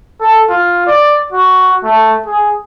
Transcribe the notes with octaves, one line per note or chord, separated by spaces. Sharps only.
A4
F4
D5
F#4
A3
G#4